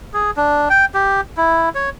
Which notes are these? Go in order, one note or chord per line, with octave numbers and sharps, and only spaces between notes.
G#4
D4
G5
G4
E4
C#5